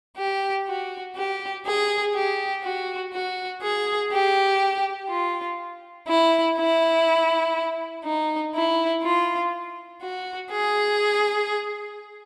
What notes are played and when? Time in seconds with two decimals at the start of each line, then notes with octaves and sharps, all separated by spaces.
0.17 G4
0.66 F#4
1.15 G4
1.65 G#4
2.14 G4
2.63 F#4
3.12 F#4
3.62 G#4
4.11 G4
5.09 F4
6.07 E4
6.57 E4
8.04 D#4
8.54 E4
9.03 F4
10.01 F#4
10.50 G#4